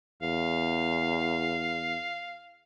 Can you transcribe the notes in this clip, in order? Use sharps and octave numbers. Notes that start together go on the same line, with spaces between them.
E2 F5